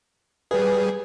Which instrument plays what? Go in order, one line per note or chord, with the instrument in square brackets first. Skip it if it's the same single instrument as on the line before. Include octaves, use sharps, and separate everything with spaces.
[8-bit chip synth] G3 G#4 [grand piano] B4